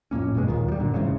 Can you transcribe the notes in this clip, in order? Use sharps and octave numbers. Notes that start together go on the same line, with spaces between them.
F2 A2 A#3 C#4
E1 G2 B2 G#3
D#2 A#2 D#3
F3 G3
F#2 A#2 D3
F1 E2 G#2 C#3